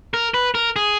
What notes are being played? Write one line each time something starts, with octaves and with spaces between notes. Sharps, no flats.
A#4
B4
A#4
G#4